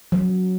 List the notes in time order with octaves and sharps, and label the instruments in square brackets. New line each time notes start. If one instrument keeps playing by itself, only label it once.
[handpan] F#3